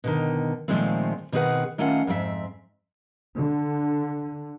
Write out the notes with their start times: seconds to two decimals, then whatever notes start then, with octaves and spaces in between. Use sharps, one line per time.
0.04 B2 D3 D#3
0.68 A#2 D#3 F3 G#3 A3 C4
1.32 B2 D#3 C4 G#4 B4 F#5
1.78 D#3 A3 C#4 F4 F5 F#5
2.07 F2 G#2 C4 F4 E5
3.37 D3